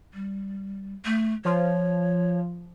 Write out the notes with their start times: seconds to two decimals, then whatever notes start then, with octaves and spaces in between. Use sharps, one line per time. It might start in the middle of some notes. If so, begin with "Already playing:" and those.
0.14 G3
1.05 A3
1.45 F3 C#5